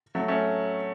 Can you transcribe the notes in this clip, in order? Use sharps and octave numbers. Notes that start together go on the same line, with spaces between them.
F#3 A3
A3 C#4